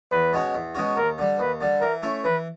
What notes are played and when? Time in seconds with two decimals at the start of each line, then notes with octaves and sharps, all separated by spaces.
0.11 E2 B4
0.33 B2 G#3 C#4 F#4
0.54 E2
0.75 B2 G#3 C#4 F#4
0.96 D#2 A#4
1.18 D3 G3
1.39 D#2 B4
1.61 D3 G3
1.81 E3 A#4
2.02 A3 C#4 E4
2.24 E3 B4